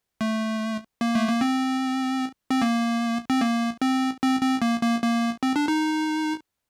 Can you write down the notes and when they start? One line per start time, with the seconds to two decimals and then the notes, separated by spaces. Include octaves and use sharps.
0.21 A3
1.01 A#3
1.15 A3
1.28 A#3
1.41 C4
2.51 C4
2.62 A#3
3.30 C4
3.41 A#3
3.82 C4
4.22 C4
4.42 C4
4.62 A#3
4.82 A#3
5.02 A#3
5.43 C4
5.56 D4
5.68 D#4